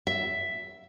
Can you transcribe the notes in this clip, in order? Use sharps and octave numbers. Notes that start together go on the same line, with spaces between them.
E5